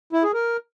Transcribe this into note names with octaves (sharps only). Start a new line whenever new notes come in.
E4
G#4
A#4